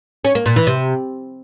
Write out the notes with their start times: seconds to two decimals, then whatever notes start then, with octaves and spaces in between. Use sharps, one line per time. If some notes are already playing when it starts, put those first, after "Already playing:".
0.25 C#4
0.35 A#3
0.46 A#2
0.56 E3
0.67 C3